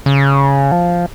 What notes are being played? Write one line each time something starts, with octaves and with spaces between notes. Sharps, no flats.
C#3
F3